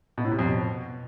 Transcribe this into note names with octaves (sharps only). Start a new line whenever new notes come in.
B2
A2
C3
F2
B2